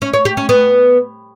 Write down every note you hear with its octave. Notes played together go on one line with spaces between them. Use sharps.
C#4
C#5
G4
C#4
B3